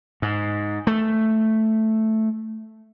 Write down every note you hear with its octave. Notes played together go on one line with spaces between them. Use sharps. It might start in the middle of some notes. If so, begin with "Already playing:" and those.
G#2
A3